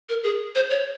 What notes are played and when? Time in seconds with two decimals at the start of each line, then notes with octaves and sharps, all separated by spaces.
0.09 A#4
0.23 G#4
0.55 C5
0.70 C#5